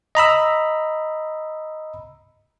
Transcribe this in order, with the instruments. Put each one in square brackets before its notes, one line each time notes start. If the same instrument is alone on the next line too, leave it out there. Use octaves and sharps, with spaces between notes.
[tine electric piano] D#5 A#5 B5 E6